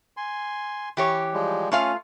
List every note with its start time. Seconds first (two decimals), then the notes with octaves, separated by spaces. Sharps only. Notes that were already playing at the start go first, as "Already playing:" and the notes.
0.17 G#5 C6
0.97 E3 G4 C#5
1.34 F3 G3 G#3
1.72 A3 C#4 F4 F5